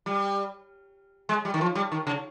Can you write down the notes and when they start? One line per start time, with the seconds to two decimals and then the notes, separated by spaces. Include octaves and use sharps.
0.06 G3
1.29 G#3
1.45 G3
1.54 D#3
1.61 F3
1.75 G3
1.92 D#3
2.07 C#3